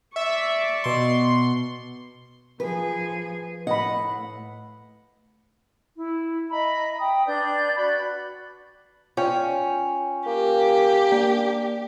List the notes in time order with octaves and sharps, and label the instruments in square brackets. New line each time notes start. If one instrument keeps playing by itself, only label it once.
[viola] D5 C#6 [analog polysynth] E5
[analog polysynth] B2 C6
[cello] F3 G#4 [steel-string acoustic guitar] B4
[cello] A2 [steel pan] D#5 B5 [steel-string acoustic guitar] F#5
[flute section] E4
D#5 E5 A#5 B5
G5 D#6
D4 B4 D5 G6
F#4 D5 B5
[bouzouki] C#4 [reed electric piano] F4 C#5 G5
[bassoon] A#3 [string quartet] G4
[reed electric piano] A#3 [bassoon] D4